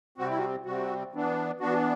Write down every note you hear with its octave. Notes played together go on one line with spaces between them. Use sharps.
C3 G3 C4 F#4
E4
F#4
C3 G3 C4 F#4
E3 B3 D4
E3 B3 D4 F#4